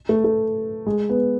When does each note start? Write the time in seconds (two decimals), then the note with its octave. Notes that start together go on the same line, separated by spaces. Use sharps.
0.09 A3
0.24 A3
0.87 G#3
1.09 B3